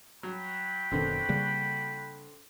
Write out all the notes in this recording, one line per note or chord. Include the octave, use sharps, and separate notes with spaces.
F#3 F#4 G5 B5
F#1 B2 D3 D#3 C4
C#3 G3 A#3